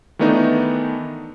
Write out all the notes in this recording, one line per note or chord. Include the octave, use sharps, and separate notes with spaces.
D#3 E3 A3 B3 D4 D#4